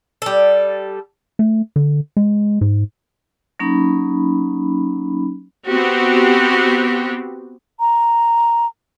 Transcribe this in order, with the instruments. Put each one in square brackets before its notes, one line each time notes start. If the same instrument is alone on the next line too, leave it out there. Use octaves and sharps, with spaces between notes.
[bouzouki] G3 A4
[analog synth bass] A3
D3
G#3
G#2
[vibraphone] F#3 A#3 C#4 D#4 B5
[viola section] B3 C4 F#4 G4
[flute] A#5